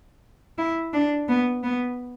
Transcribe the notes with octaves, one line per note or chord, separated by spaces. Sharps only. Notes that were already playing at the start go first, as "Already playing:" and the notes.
E4
D4
B3
B3